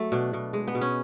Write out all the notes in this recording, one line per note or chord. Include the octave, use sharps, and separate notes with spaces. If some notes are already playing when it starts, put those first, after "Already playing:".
Already playing: F#3 A3
B2 D4
B2
G#3
B3
B2
C#4